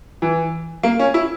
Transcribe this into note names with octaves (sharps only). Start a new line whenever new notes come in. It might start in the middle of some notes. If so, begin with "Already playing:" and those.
E3
A#3
C#4
E4